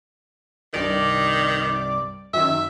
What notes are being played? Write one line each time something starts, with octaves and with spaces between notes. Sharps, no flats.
C2 G2 D#3 D5
F#2 D#3 E5